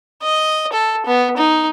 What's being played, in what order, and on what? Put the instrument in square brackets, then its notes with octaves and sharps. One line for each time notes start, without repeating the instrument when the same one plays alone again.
[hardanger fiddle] D#5
A4
B3
D#4